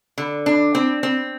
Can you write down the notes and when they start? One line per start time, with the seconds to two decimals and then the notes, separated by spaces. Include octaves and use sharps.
0.18 D3
0.46 D4
0.75 C4
1.03 C4